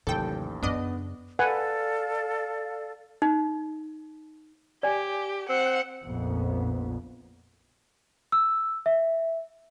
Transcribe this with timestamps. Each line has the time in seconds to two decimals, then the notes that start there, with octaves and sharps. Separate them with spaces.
0.07 A1 D#2 C3 F#3 A4 G5
0.63 F#2 C#3 B3 D4 D#5
1.39 A4 B4 D5 F5 F#5 G#5
3.22 D#4
4.83 G4 D5 G#5
5.49 C4 F#5
6.04 A#1 F2 A#2 B3
8.32 E6
8.86 E5